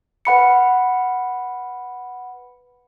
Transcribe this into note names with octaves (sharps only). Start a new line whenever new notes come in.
B4 F#5 B5 C#7